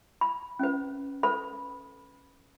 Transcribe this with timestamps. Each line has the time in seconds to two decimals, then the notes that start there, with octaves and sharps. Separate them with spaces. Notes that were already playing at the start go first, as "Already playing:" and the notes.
0.21 B5
0.59 C#4 B4
1.23 A4 B4 B5